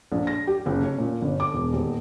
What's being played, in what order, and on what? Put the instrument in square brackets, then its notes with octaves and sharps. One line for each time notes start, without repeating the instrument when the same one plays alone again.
[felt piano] A#1
A#6
G4
F#1
C#4
A#2
G1
D6
E1
D#1